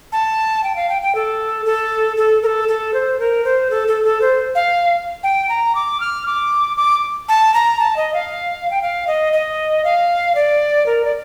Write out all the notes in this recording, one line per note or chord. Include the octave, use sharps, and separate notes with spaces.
A5
G5
F5
G5
G5
A4
A4
A4
A#4
A4
A4
C5
A#4
C5
A4
A4
A4
C5
F5
G5
A#5
D6
F6
D6
D6
A5
A#5
A5
D#5
F5
G5
F5
D#5
D#5
F5
D5
A#4
D5